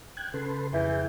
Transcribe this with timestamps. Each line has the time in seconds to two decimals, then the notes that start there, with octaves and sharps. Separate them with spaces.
0.17 G5 F#6 G#6
0.34 C#3 A4 B4 C6
0.73 F2 E3 G#4 G5